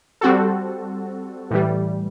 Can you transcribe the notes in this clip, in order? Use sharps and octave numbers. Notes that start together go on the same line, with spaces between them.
G3 C4 F#4 A4
A2 E3 G3